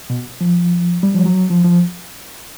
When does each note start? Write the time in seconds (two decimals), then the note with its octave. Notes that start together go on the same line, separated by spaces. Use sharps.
0.10 B2
0.41 F3
1.03 G3
1.15 F3
1.26 F#3
1.50 F3
1.65 F3